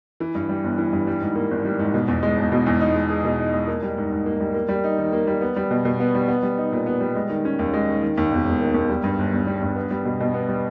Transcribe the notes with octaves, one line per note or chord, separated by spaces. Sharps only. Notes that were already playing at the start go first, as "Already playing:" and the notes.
E3
G2
G3
G1
E3
G2
G3
G#2
A#3
G#1
G3
G#2
B2
E2
G#3
E1
B2
E2
D#4
G#3
G#4
B2
D#4
G#3
A#3
G3
G#2
G#2
A#3
G3
A#3
G3
D#4
D#3
A#3
G3
B3
G3
B2
B2
B3
G3
B3
G3
D#4
A#2
B3
G3
G#3
D#3
C#4
D#2
G#3
D#3
D#3
D#2
E1
E1
D#3
D#2
G3
G2
G1
G1
G3
G2
B3
G3
B2
B2
B3
G3